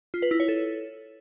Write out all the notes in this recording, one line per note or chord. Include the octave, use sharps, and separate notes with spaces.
F4
B4
E4
C#5
A4